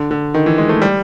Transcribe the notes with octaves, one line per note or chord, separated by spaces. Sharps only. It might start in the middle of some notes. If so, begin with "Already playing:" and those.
Already playing: D3
D3
D#3
E3
G#3
A3
G3